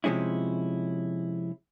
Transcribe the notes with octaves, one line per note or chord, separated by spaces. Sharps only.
C3 F3 G#3 C#4 E4